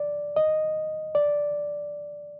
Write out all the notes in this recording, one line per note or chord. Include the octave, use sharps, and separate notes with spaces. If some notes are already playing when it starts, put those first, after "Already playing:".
Already playing: D5
D#5
D5